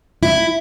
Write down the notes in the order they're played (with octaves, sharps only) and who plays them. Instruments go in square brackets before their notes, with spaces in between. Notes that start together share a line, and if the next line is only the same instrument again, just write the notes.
[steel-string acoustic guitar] E4